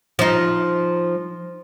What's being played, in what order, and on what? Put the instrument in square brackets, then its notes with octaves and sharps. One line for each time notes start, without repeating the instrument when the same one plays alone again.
[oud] F3 D#4